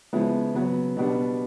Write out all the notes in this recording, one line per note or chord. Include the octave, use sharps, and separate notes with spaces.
C#3 F3 G#3 B3 E4
C#3 F#3 B3
B2 G3 B3 D4